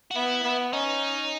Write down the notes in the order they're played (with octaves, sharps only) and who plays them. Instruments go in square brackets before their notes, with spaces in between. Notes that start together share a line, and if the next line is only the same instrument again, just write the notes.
[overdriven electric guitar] F#4
[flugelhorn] B3 [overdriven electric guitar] E4
[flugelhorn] B3
[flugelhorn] C#4 [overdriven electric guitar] D#4